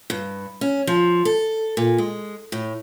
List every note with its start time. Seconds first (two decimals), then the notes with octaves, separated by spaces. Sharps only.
0.10 G2
0.61 C#4
0.87 F3
1.25 A4
1.77 A#2
1.98 G#3
2.52 A2